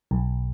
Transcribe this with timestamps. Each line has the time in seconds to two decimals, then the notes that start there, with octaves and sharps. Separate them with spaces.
0.11 B1